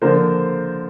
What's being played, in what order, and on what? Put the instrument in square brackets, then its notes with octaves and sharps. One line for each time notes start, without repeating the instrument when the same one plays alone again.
[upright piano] D3 F3 A#3 A#4 C5